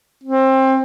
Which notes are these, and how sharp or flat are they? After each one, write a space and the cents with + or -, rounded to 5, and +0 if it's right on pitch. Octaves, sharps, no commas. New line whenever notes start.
C4 +25